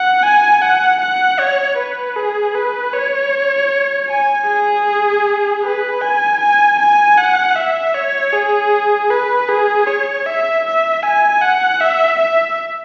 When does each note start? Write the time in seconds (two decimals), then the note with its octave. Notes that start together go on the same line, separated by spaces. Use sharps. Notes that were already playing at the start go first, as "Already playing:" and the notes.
Already playing: F#5
0.23 G#5
0.62 F#5
1.01 F#5
1.39 C#5
1.77 B4
2.16 G#4
2.55 B4
2.93 C#5
4.09 G#5
4.48 G#4
5.63 B4
6.01 G#5
6.40 G#5
6.79 G#5
7.17 F#5
7.56 E5
7.95 C#5
8.33 G#4
9.10 B4
9.49 G#4
9.87 C#5
10.26 E5
10.64 E5
11.03 G#5
11.41 F#5
11.81 E5
12.19 E5